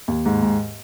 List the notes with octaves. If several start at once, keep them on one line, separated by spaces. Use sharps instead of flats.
D#2
G#2
G#2